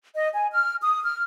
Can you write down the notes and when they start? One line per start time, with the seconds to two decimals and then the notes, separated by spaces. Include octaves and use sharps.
0.15 D#5
0.35 G#5
0.52 F6
0.82 D#6
1.04 F6